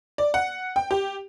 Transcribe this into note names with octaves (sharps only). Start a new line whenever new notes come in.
D5
F#5
G5
G4